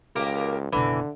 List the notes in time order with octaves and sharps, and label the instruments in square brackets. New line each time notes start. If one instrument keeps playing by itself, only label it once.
[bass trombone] C#2 [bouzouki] A#3 G4 A#4
[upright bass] F#1 B2 [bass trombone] D3 [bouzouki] E3